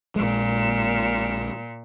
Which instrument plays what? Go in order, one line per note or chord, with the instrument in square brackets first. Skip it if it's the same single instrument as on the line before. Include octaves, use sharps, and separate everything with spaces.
[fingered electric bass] A#1 G#3 [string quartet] A#2